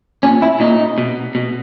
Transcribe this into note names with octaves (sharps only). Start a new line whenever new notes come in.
A#2 C#4
E4
A#2 D#4
B2
B2